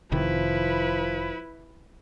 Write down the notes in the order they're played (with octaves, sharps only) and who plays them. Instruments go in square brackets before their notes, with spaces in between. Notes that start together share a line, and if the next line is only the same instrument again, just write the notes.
[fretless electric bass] F1 C3 D#3 [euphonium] F3 [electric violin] E4 B4